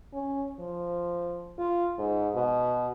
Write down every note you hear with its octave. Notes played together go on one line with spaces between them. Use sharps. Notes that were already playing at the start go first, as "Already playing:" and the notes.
C#4
F3
F4
G#2
B2